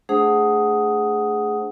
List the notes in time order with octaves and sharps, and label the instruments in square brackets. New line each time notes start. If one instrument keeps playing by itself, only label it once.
[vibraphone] A3 D4 G#4 C5 F#5 D#6